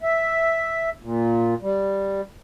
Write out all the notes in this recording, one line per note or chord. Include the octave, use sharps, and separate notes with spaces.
E5
A#2
G3